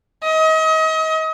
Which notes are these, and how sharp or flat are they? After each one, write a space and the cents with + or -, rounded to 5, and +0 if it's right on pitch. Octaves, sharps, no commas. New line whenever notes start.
D#5 +35